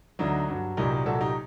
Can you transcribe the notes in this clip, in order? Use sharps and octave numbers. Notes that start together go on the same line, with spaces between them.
D2 D3 F#3 D#4
G2 F#3 F#4
C2 A#2 F#3 D#4 G4
C2 A#2 F#3 F#4 A4
D#4 G4